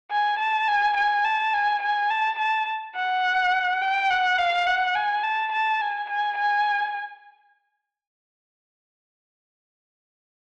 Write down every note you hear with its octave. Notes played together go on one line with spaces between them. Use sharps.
G#5
A5
G#5
G#5
A5
G#5
G#5
A5
A5
F#5
G5
F#5
F5
F#5
G#5
A5
A5
G#5
G#5
G#5